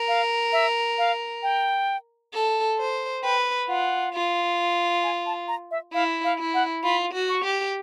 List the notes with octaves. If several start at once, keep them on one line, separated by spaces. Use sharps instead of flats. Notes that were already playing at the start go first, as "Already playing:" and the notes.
Already playing: A#4
F5
E5
F5
G5
A4
C5
B4 G5
F4 F#5
F4
G#5
A5
A#5
E5
E4 F5
F5
E4
F#5
F4 B5
F#4
C#6
G4